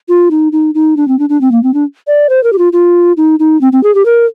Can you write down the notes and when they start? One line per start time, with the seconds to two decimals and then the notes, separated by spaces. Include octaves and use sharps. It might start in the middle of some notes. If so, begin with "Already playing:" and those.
0.09 F4
0.31 D#4
0.52 D#4
0.75 D#4
0.97 D4
1.08 C4
1.19 D4
1.29 D4
1.41 C4
1.52 A#3
1.63 C4
1.74 D4
2.07 D5
2.29 C5
2.44 A#4
2.53 G4
2.58 F4
2.73 F4
3.17 D#4
3.39 D#4
3.61 C4
3.72 C4
3.83 G#4
3.95 G4
4.06 A#4